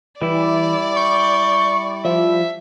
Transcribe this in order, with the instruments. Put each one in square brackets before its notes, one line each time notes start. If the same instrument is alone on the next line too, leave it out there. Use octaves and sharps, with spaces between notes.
[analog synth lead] E3 [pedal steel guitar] G3 E4 [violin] D5
[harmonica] C#6 [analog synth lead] G6
[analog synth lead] F3 [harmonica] E5